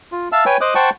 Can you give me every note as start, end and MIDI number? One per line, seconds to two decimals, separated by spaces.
0.12 0.29 65
0.32 0.44 76
0.32 0.44 77
0.32 0.44 81
0.32 0.44 88
0.46 0.57 71
0.46 0.57 73
0.46 0.57 79
0.46 0.57 80
0.61 0.74 72
0.61 0.74 75
0.61 0.74 86
0.61 0.74 87
0.61 0.74 90
0.75 0.90 72
0.75 0.90 78
0.75 0.90 79
0.75 0.90 81
0.75 0.90 85